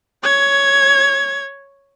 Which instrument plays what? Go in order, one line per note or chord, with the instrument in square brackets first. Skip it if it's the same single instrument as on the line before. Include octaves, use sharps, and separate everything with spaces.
[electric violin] C#5 G#6